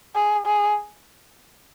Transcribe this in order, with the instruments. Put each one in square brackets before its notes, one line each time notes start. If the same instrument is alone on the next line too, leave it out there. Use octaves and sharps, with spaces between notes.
[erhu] G#4
G#4